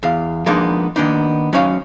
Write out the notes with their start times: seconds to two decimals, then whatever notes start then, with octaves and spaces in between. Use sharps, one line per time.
0.03 E2 F5
0.46 F3 G#3 A#3 B3 D4 D#4
0.96 D#3 A#3 B3 D4 D#4
1.53 F#3 C#4 D#4 C#5 F5